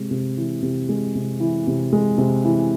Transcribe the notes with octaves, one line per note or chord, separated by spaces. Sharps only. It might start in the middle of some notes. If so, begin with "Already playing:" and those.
Already playing: C3 G#3
C3
E3
C3
G#3
C3
E3
C3
G#3
C3
E3